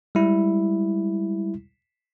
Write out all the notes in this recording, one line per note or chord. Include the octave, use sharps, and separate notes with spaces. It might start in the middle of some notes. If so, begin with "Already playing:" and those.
G3 G#3 E4